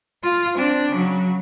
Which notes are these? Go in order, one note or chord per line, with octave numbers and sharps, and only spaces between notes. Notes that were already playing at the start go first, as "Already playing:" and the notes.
F4
C4 D4
C#3 F#3